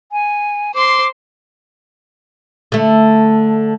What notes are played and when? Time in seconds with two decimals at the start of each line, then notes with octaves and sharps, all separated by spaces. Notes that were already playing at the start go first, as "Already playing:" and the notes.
0.12 G#5
0.75 C5 C6 D6
2.72 D3 A3